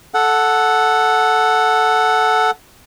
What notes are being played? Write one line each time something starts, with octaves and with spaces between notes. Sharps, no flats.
A4 F#5